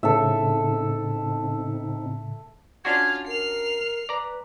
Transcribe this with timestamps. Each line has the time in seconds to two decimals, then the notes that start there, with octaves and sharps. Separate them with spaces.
0.03 A2 C#3 C4 D#4 A4 E5
2.85 C#4 D4 F4 F#4 F5 G#6
3.27 A#4 C7 F7
4.09 B4 D5 A#5